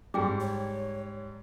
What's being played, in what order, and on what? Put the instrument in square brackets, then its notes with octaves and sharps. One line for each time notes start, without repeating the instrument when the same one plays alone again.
[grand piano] G#2 G3 [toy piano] G#4 G5 D6
[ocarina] C#5